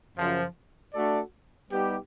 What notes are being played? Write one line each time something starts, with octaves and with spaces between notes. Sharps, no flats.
F#2 C#3 F3
A3 D4 F#4 A4 D5
G3 B3 D#4 G4